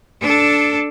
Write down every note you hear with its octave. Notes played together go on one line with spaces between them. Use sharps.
D4 A4